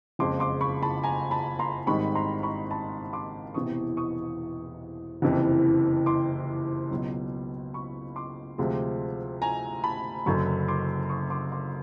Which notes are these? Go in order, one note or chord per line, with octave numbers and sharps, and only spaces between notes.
F#1 F2 C#3 F3 G#3 C6 D6
C6 D6
B5 C#6
A5 B5
G#5 A#5
A5 B5
A#5 C6
G#1 G#2 D#3 G3 B5 C#6
A#5 C6
B5 C#6
A5 B5
C6 D6
E1 E2 C3 E3 C#6 D#6
C#6 D#6
F#1 F2 C3 E3
C6 D6
C#2 B2 F#3
B5 C#6
C6 D6
D2 C3 F3 G#3
G#5 A#5
A5 B5
F#1 F#2 D3 F#3 B5 C#6
C6 D6
C#6 D#6
C6 D6
C6 D6